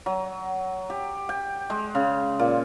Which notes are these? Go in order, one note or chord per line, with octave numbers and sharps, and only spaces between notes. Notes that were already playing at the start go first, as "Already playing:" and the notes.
F#3
G4
G5
G#3
C#3
A#2